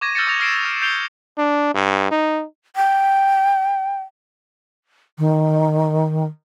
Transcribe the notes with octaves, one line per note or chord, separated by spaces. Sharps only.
C#6 D6 G#6 A#6 D#7
E6 F6 G6 A6 A#6 C#7
C#6 D#6 A6 A#6 F7
F6 A#6 C7 D7 E7
F6
G6 C7 D7 F7 G7
D4
G2
D#4
G5
D#3